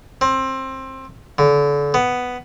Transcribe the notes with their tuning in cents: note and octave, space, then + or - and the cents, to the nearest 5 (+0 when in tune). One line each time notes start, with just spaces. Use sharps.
C4 +20
D3 -35
B3 +5